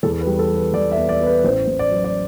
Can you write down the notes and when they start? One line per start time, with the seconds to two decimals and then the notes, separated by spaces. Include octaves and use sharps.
0.03 E2 A4
0.21 B4
0.27 G3
0.39 A4
0.50 G3
0.56 B4
0.73 E2 D5
0.92 E5
0.97 B3
1.09 D5
1.21 B3
1.26 B4
1.44 A1 C5
1.68 A1
1.79 D5
1.91 F#3
2.04 D5